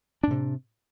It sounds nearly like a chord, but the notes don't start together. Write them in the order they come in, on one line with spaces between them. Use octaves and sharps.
D4 A2 C3